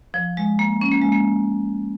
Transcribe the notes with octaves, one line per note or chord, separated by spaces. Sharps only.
F3
G#3
A#3
C#4
A#3
G#3
A#3